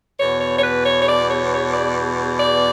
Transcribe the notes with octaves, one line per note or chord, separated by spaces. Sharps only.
E2 B2 C#5
C#5
C#5
B4
C#5
C#5
D5
C#5
C#5
D5
D5